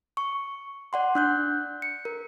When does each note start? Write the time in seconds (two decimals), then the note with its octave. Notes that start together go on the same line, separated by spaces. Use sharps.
0.17 C#6
0.93 D5 F#5 C6
1.15 D4 F#6 G6
1.82 C#7
2.05 A#4